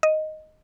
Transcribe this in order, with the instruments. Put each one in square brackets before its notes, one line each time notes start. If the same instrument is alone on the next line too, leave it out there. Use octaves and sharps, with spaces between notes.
[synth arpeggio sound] D#5